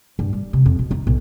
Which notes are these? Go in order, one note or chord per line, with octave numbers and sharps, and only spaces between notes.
G2
G3
C3
F2
B2
D#4
B1